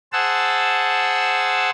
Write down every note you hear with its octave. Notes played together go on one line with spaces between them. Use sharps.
G#4 C5 F#5 A5 E6